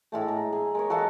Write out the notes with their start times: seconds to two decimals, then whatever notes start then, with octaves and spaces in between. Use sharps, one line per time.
0.12 A2 G#3 A3
0.28 A#5
0.52 G#4
0.75 G#3 A#4 C#5
0.90 F#4 A4 D#5 F5